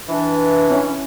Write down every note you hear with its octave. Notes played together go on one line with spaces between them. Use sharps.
E3 D4
C#4 E4